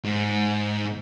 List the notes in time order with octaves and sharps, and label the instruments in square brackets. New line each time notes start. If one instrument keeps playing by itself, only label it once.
[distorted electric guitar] G#2